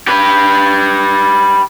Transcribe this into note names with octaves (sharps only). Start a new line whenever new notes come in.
G4 B4